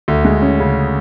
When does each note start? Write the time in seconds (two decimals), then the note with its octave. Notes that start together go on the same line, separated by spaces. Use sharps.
0.08 D2
0.25 G#3
0.42 C#4
0.60 C#3